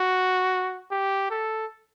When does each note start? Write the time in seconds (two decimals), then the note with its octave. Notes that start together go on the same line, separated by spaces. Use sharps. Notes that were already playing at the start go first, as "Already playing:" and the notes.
Already playing: F#4
0.92 G4
1.31 A4